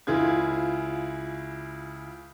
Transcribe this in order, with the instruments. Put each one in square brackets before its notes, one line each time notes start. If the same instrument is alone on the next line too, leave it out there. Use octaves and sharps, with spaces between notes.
[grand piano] C#2 E4 F4 G#4 G#6